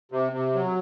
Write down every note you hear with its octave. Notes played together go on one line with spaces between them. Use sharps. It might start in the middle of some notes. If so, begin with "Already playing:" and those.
C3
C3
F#3